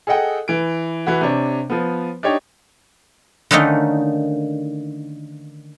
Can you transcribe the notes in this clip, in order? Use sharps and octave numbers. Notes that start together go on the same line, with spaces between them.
G#4 A4 D#5 F#5 G5
E3 D7
E3 E4 F#4
C3 D4 C#5
F3 B3
D4 D#4 G4 C#5
D3 D#3 A3 A#3 C#4 D#4